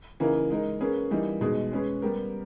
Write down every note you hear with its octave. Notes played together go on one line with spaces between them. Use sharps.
C#3 E3 A#3 D#4 A#4
G#3 D#4 A#4
A#3 C#4 G#4 B4
E3 G3 A#3 D#4
B2 G#3 D#4 G#4
G#3 C#4 G#4 B4
G3 B3 G4 A#4